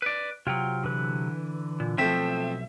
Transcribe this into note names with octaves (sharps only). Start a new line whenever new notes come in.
B4 D5
C3 F#3 F4 G5
D3 E3 B4
A#2
B1 F3 A3 C4 E5